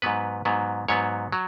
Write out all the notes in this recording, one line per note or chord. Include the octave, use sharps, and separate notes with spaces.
G#2 F#3 B3 B4
G#2 F#3 B3
G#2 F#3 B3 C#5
F#3